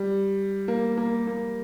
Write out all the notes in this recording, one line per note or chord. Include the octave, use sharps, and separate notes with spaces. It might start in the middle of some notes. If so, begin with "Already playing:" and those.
Already playing: G3
A#3
A#3
A#3